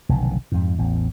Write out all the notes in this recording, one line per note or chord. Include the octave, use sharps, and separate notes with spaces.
F1 B1 D3 D#3
F2 G#2
A1 E2